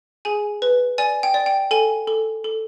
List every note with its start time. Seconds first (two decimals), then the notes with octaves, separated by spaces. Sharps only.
0.25 G#4 G#5
0.62 B4
0.98 D5 G#5
1.23 G5
1.34 D5
1.46 G5
1.71 A4 G#5
2.07 A4
2.44 A4